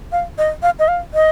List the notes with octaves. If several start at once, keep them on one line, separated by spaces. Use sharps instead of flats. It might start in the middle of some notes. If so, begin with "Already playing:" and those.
F5
D#5
F5
D#5
F5
D#5